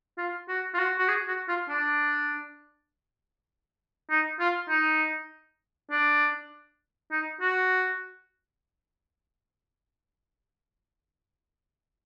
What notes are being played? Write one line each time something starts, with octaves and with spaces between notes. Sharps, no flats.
F4
F#4
F4
F#4
F#4
G#4
F#4
F4
D4
D#4
F4
D#4
D4
D#4
F#4